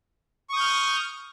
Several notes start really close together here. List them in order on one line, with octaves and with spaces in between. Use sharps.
C#6 D#6 G6 F6